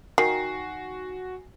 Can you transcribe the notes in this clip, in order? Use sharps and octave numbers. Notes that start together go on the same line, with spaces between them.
D#3 F#4 G#5 C7